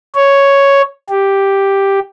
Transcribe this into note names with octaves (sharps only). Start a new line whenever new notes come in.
C#5
G4